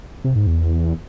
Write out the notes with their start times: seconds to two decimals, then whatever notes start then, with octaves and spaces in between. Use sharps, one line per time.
0.24 C3
0.36 G#2
0.47 E2